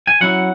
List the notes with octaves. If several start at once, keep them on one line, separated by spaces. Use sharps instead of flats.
G#5
F#3 C#4 E4 F#5